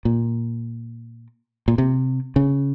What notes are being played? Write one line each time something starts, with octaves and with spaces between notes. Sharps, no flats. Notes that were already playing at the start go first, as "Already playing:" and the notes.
A#2
A#2
C3
C#3